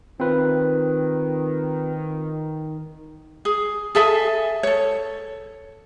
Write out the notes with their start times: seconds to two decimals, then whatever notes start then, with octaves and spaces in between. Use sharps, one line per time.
0.20 D#3 C4 F4 B4
3.45 G#4
3.95 G#4 A4 E5 G#5
4.63 A4 C#5